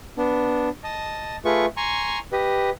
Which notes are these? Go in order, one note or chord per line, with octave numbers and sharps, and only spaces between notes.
B3 D4
D#5 A5
A3 F4 G#4 B4 C#6
G#5 A#5 C6 C#6
G4 B4 D#5